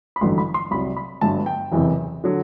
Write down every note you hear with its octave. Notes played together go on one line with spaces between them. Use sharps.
B5
A1 G2 D3 F#3 C6
B5
C6
C2 C3 F#3 B5
B5
G1 G2 F#3 A5
G5
F#1 E2 C3 E3
D3 F#3